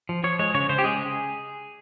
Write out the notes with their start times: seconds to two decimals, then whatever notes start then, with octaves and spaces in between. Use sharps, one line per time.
0.09 F3
0.24 F3 C#5
0.39 G#3 C#5
0.54 C#3 C#5
0.69 C#3 C5
0.79 G4
0.84 G#3 G#4